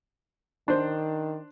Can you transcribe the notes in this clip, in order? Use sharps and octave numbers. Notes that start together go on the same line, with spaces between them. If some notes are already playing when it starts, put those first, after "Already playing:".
D#3 D4 C5